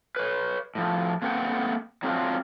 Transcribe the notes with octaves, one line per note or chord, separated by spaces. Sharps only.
B4 C#5
A2 F3
A3 A#3 C4 B4 F#5 G5
F#3 C4 D4 F4